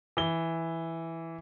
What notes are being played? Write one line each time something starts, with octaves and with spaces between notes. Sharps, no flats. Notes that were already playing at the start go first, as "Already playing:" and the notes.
E3 G7